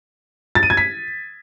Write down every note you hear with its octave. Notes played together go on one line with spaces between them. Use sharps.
A6
D#7
G#6
B6